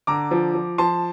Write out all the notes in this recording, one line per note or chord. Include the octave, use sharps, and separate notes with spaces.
D3 A#5 D6
F3
F3
F3 A5 C6